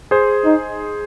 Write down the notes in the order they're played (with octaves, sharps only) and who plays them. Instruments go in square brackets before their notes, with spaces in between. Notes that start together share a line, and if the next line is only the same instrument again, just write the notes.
[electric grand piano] G#4 C5
[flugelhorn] D#4